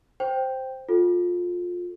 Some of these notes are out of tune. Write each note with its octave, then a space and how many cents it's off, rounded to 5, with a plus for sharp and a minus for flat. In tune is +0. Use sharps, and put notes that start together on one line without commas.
C5 +0 G5 +0
F4 +20 A4 +0